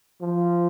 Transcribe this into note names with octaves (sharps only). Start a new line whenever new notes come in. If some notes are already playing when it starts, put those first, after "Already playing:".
F3